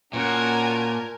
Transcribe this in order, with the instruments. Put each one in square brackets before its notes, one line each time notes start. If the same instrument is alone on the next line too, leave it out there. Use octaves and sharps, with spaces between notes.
[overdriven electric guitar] A#2 [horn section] C#4 F#4 [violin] A#4 [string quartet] G#5 A5